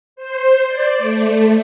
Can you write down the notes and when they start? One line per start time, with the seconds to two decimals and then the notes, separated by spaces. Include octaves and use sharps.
0.16 C5
0.68 D5
0.98 A3